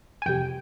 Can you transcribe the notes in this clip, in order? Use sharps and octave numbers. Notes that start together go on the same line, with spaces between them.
G#5
F2 C3 G3 G5